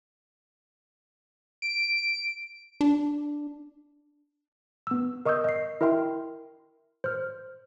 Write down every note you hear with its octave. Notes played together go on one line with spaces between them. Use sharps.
D7
D4
B3 E6
A#4 D#5 C#6 D#6 E6 G6
D#5 C7
E4 A#4 E5 G5 C6
C5 F6